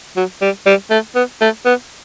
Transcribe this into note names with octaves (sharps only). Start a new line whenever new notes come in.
F#3
G3
G3
A3
B3
A3
B3